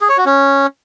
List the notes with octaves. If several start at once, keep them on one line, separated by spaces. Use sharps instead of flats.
G#4
C#5
F#4
C#4